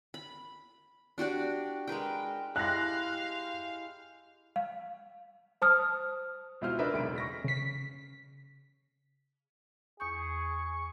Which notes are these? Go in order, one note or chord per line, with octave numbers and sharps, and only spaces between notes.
B5
D4 F#4 G4 D5
G#3 A#4 B4 G5
G#3 E4 G4 F5 F#6 A#6
F5
C5 A5 D#6 F6
C#2 B2 E4 F4 C5 F6
D4 A#4 B4 D#5 E5
E1 B1 C#3 D7
C#6 A#6 B6
C#3 B6
E2 G#4 C#6 D#6 G6